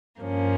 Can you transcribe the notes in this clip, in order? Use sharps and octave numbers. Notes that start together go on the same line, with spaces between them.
G2 F3 A#3 C#4